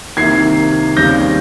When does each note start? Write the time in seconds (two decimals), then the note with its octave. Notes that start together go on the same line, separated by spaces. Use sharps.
0.17 C2 C3 D#3 A#3 G#6 C7
0.96 D#2 C#3 G3 C4 G6 A#6